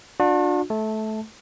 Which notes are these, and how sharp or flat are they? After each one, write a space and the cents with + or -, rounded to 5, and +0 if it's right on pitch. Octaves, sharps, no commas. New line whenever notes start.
D4 +15 F#4 -45
A3 -20 A5 +0